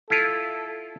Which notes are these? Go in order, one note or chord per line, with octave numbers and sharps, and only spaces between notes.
E4 F4 A4